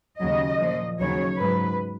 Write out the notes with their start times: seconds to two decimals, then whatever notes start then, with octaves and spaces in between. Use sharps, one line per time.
0.20 D#2 C#3 F#3 D#5
0.59 A#2 F3
0.99 D#2 C#3 F#3 C#5
1.39 G#2 F#3 B4